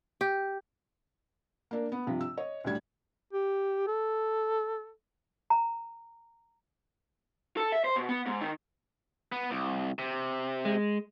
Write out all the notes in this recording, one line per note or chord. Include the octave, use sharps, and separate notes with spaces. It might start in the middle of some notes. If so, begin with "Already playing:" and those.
G4
A#3 D4 A#4
B3
G2 C3 F3
E6
C#5 D#5
D2 A2 G3 G#6
G4
A4
A#5
A4
E5
C5
B2
B3
G#2
D#3
B3
C2
C3
G#3